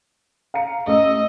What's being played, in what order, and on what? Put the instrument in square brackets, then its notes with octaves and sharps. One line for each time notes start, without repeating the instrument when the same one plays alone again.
[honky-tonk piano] F5 A#5 C#7
[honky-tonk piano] A1 E6 [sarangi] D#5